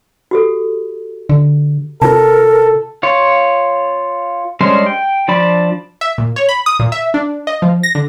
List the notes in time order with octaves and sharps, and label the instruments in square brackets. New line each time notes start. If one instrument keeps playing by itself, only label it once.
[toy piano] F#4 G4 A4
[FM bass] D3
[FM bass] C3 [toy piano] F4 A5 [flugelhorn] A4 [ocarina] A#4
[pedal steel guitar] F4 C#5
G3 G#3 C#4 D4 C5
G5
F3 D4 D5 A5 B5
[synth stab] E5
A#2
C#5
B5
D#6
A#2
E5
D4
D#5
F3
A#6
D3